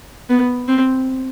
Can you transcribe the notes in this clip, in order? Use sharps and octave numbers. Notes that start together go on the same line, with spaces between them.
B3
C4